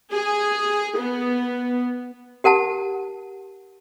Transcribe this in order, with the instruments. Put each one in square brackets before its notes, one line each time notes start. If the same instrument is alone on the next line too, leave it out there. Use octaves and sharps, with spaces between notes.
[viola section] G#4
B3
[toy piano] G4 A#4 F#5 A5